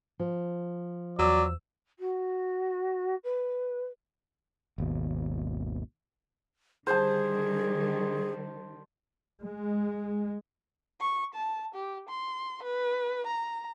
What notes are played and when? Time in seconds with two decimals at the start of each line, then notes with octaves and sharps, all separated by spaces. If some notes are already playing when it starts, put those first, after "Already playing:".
0.19 F3
1.19 E2 F#3 D5 E6
1.99 F#4
3.24 B4
4.78 G#1 D#2 B2
6.87 D3 D#3 G3 G#4 C5 A5
9.43 G#3
11.01 C#6
11.34 A5
11.75 G4
12.09 C6
12.63 B4
13.27 A#5